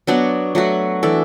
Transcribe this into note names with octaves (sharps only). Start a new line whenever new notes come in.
F#3 B3 D4 F#4
F#3 A3 F#4
E3 D4 A4